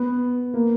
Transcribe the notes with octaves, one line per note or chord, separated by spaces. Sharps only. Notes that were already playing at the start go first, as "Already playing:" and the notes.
Already playing: B3
A#3